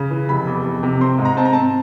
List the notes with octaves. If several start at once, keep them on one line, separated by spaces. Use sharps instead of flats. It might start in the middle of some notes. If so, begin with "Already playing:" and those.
Already playing: C#3
E3
F1 B5
E2
F1
C3
C4 C6
G#2
A#5
C4 A5
A#5
C4 A5